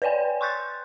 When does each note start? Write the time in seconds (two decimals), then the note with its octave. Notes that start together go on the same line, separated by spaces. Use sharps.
0.02 B4 C#5 D5 G5 G#5
0.41 C6 C#6 F#6 G6 A6